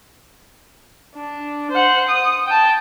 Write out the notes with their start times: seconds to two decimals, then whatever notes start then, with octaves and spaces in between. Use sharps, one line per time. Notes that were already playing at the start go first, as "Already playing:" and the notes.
1.15 D4
1.71 C5 F#5
2.08 D#6
2.47 G5 A5